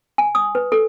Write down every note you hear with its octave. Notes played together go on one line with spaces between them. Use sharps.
G#5
D#6
B4
A4